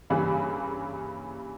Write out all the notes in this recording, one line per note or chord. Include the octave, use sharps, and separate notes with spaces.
G2 C#3 E3 G3 A#3 G#4